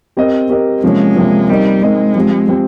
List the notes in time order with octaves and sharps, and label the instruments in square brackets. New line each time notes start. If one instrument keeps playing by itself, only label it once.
[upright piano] C4 G4 A#4 D#5
C4 G4 A#4 D#5
[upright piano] C3 F3 A#3 C#4 [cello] G#3
[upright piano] C3 F3 A#3 C#4
[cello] G3 [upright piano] C4 D#4 A#4 D#5
[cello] G#3 [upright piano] C4 D#4 A#4 D#5
[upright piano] F3 C4 G4
F3 C4 G4